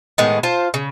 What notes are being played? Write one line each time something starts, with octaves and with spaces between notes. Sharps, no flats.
A2 D#3 G#3 B3
F4 C5 A5
C#3